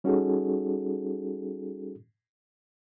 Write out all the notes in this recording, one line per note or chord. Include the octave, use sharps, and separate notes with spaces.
G3 C#4 D#4 F#4 G#4 A4